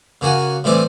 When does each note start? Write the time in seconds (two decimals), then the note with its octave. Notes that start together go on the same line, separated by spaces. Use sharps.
0.21 C#3 A#3 F#4 G#5
0.64 A2 E3 G3 C4 D5 G#5